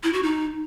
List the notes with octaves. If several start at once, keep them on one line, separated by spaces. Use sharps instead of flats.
E4
F#4
D#4